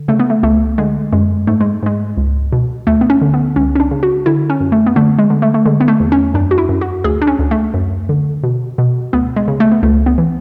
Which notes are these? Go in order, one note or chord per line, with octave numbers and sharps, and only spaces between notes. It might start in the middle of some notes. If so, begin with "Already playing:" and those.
Already playing: D3
C#3 A3
B3
A3
C#2 A3
D3 G#3
F#2 G#3
G#2 A3
G#3
G#2 G#3
C#2
B2
D2 A3
B3
C#4
D3
B3
C#2 C#4
C#4
D4
C#3
F#4
D3 E4
C#4
F#2
A3
B3
D3 A3
G#3
D3
A3
A3
D3 G#3
B3
A3
E2
C#4
F#2 D4
F#4
E4
F#2
F#4
D2 G#4
D4
C#4
D2
A3
F#2
D3
B2
B2
D2 B3
G#3
C#3
A3
B3
C#2 A3
B3
E3